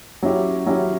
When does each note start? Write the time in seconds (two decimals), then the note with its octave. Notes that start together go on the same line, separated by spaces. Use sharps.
0.22 F#3 C#4 E4 G4
0.66 F#3 C#4 E4 G4